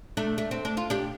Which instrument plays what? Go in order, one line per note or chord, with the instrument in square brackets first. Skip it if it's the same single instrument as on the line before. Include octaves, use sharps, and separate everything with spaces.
[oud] A3 D4
A3
C4
D4
F4
D4 G4